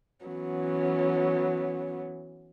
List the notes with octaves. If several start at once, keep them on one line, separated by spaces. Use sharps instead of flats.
E3 F#3 B3 C#4